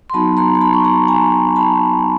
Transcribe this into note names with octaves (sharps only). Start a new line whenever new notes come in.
C6
F#3 B3 D#4 F#4 A5 B5
A#5 C6
C6
A5 B5
C#6
A#5 C6
G#5 A#5
A5 B5